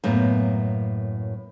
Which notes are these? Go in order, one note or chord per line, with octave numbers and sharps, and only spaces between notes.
F#2 A2 A#3 B3